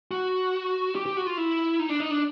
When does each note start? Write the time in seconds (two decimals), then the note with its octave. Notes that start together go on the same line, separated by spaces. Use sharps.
0.11 F#4
0.96 G4
1.06 G4
1.17 F#4
1.27 F4
1.38 E4
1.79 D#4
1.89 D4
2.00 D#4
2.11 D4